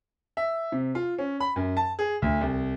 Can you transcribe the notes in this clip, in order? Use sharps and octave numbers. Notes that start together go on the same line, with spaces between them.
E5
C3
F4
C#4
B5
F#2
A5
G#4
D2
C2